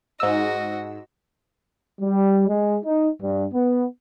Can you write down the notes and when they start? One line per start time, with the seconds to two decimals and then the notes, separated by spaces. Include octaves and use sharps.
0.20 G#2 F#4 D#5 E6
2.01 G3
2.49 G#3
2.85 D#4
3.21 G2
3.53 B3